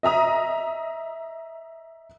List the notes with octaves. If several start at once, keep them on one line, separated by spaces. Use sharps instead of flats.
D#5 E5 A#5 D#6